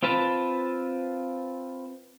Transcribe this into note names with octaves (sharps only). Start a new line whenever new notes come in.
C4 F4 B4 A5